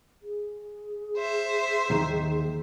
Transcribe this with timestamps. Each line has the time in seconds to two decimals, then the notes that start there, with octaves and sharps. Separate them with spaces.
0.22 G#4
1.16 C5 E5
1.90 D#2 D#3